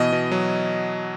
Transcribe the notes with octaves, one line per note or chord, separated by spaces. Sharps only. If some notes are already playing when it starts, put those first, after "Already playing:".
Already playing: B2 E3 D#5
B2
F#3